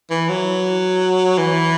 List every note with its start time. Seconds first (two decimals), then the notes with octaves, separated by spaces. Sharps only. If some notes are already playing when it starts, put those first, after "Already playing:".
0.11 E3
0.29 F#3
1.38 E3